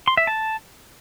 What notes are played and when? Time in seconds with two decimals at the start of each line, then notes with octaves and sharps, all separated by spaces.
0.08 C6
0.17 E5
0.27 A5